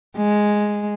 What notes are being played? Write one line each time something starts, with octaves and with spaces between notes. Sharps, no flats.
G#3